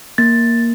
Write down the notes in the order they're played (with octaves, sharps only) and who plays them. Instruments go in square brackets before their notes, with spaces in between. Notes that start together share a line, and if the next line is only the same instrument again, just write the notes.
[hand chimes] A#3 A6